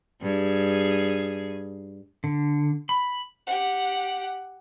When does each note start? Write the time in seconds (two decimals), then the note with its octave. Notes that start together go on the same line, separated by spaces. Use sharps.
0.22 G2 G#4
2.24 D3
2.89 B5
3.46 G4 F#5